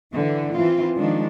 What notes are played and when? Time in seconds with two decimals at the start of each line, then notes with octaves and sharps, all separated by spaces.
0.14 D3 E3
0.53 E3 C4 F4
0.96 D#3 F3 G#3 D4